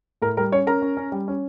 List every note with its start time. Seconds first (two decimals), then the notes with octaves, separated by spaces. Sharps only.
0.22 A2 A#4
0.37 G3 A#4
0.52 C#4 C#5
0.67 C#4 A#4 A#5
0.82 C#4
0.97 C#4
1.12 G3
1.28 C#4